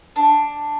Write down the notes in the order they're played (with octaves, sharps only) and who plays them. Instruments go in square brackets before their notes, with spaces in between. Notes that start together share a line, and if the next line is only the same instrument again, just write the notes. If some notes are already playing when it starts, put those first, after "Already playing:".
[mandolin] D4